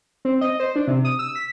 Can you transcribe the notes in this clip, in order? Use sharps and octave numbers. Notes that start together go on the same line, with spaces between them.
C4
D#5
C5
D4
C3
D#6
E6
B6